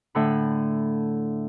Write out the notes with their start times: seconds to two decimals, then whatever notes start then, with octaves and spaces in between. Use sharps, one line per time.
0.15 A2 D3 B5